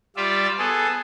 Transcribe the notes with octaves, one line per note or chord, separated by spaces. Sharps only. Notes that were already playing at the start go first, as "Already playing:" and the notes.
G3 F4 D5 E5
B3 G#4 A4